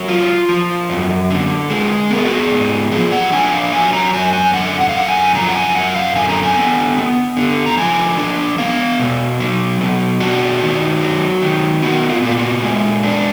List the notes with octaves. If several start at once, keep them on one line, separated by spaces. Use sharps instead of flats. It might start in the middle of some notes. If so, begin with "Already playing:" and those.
Already playing: F#3 A#4
F4
F3
F#2
D3
G#3
B3 A#4
G#4
F#4
G#4
G#2
F3 G#4
F#5
D4 G#5
F#5
F5
F#3 G#5
A#5
F#2 G#5
G#5
D3 F#5
F#5
F5
F#2 F#5
G#5
F3 A#5
F#5
G#5
F#2 F#5
F5
D3 G#5
A#5
G#5
B3
B3
D3
A#5
F3 G#5
D4
B3 F5
B2
F#3
B2
D4 F#4
D#3
F#3
D#3
B3 F#4
F4
A#2 F4
F#4
G#3
D4